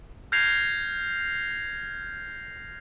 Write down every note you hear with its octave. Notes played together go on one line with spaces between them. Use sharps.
F6 G6 G#6 A#6 C7 F7